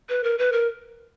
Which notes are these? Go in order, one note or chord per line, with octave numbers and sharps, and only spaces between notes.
B4
A#4
B4
A#4